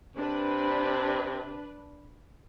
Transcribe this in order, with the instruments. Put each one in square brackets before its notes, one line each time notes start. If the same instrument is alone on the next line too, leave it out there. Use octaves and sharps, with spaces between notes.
[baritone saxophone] C3 [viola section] D4 B4